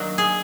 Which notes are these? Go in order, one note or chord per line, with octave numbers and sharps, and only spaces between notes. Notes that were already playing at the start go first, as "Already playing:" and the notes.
Already playing: D#3 F#3 A#3 D4
G#4